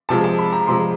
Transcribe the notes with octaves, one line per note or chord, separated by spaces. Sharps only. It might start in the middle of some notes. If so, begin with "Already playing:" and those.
C3 F3 G#3 A5
A5
B5
A#5
C3 F3 G#3 C6